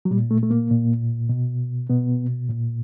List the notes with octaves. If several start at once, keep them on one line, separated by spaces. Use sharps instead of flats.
F#3
A#2 G3
A3
A3
A#3
A#2
B2
B2 B3
A#2